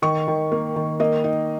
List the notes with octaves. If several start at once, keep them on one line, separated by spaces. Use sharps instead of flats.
D#3 C#6
D#3
A#3
D#3
A#3 D#5
D#4